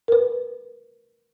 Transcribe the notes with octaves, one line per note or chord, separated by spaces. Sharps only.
A#4 B4